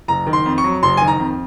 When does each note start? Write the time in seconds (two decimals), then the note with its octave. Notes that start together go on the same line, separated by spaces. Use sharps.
0.08 F#1 A#5
0.27 D#3
0.33 C6
0.46 F2
0.58 C#6
0.64 F#3
0.83 F#1 C6
0.97 D#3 G#5
1.07 A#5
1.19 F2